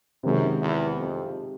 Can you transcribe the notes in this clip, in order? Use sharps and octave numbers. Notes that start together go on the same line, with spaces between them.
F#2 C3 D#3 G#3
E2
F2